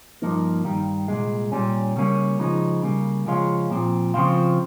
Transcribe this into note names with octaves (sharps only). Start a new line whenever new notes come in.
G2 F3 A#3 D#4
G2 D#3 G3
C2 A#2 G#3
A#2 G3 C#4
C#3 G3 A#3 C#4
C#3 F3 G#3 D#4
C#3 G3 A#3
C#3 F3 G#3 C#4 F4
A#2 F3 C4
C#3 F3 C4 F4